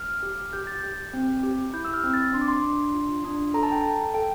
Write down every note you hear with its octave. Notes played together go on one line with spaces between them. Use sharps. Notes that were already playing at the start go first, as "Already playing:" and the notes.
Already playing: F6
G4
G4 G6
A6
G4 G6
C4
G4
E4 G6
E6
F6
C4
A6
D4 C6
D6
C6
D4
F4
D4
A4 A#5
A5
G5
A4 A5
A4 G5